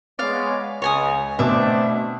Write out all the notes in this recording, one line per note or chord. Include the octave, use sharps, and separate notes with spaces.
G#3 B3 C#5 D5 F5
C#2 C#5 G#5 D#6
B2 A3 C4 D4 D5 E5 D6